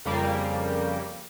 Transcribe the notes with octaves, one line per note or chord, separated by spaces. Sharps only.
F2 C#3 G3 A#3